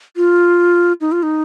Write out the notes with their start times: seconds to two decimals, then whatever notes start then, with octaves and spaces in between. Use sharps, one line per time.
0.17 F4
1.01 D#4
1.12 F4
1.23 D#4